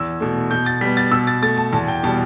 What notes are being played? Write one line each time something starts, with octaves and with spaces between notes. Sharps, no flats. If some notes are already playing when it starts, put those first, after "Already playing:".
Already playing: E2 E6
B2 A3
B2 G6
A6
G3 B3 B6
A6
B2 E6
A6
A3 A6
A5
E2 A5
G5
B2 G3 A5